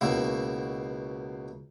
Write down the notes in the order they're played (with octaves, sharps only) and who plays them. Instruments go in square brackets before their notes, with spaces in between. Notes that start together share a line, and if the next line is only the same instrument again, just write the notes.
[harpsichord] C#2 B2 A#3 E4